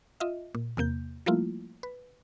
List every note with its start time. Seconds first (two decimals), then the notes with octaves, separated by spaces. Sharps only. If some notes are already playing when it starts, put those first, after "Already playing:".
0.20 F4 D#5 E5
0.55 A#2
0.77 E2 C3 A#3 G6
1.26 F3 G3 A3 A#3 E4 F4
1.83 B4